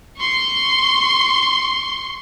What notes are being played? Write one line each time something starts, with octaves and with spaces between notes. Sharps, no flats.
C6 C#6